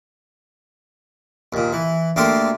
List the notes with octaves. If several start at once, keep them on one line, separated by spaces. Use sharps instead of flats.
D#2 A#2
E3
D2 A#3 G4 A4 C6